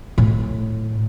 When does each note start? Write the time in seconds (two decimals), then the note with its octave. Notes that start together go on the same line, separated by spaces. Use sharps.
0.18 A2